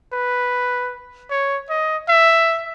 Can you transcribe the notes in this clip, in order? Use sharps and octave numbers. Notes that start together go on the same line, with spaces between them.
B4
C#5
D#5
E5